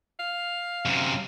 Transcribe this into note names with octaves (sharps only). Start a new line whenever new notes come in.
F5
F#2 C3